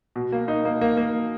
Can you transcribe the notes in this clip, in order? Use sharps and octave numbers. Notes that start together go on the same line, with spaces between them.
B2
A#3
D#4
A#3
A#3
A#3